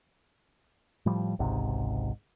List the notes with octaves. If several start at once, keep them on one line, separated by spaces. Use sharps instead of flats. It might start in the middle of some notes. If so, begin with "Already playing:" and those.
A2 F3 G3
G#1 C#2 G#2 C3